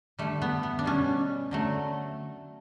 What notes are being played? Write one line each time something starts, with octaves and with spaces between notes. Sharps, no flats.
D3 G3 A3
B3
B3
D4
B2 G3 C#4
D3 F#3 A3